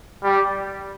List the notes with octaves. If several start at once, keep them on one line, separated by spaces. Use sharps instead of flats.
G3